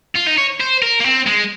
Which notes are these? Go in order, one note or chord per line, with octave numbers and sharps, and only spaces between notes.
F4
D#4
C#5
C5
A#4
A#3
C4
G#3